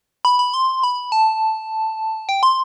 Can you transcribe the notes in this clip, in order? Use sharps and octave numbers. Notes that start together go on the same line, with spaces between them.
B5
B5
C6
B5
A5
G5
C6